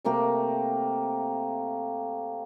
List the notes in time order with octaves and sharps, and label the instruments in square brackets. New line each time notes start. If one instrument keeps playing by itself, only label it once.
[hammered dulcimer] C3 A3 A#3 G4